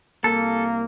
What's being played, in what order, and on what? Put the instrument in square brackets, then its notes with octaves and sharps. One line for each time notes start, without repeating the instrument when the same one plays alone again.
[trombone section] C2 A#3 [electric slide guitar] A4